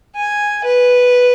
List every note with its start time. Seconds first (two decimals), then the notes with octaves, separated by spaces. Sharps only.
0.16 G#5
0.65 B4